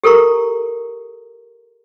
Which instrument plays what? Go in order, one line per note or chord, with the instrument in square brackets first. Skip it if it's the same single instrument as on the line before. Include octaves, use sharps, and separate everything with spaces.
[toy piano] G4 A4 A#4 A#5 C#6